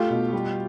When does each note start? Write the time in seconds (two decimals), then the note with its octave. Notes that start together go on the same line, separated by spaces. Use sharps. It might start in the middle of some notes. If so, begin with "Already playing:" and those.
Already playing: A3 F4 G4
0.10 B2
0.33 G3